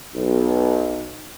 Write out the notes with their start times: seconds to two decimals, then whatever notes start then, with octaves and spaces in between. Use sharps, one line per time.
0.15 B1